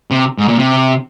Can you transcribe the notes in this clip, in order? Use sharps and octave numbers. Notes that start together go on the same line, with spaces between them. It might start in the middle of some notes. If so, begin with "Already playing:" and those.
C3
G#2
A#2
C3